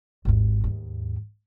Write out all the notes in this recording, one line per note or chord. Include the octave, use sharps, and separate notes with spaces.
G#1 D#2
D#2 G#2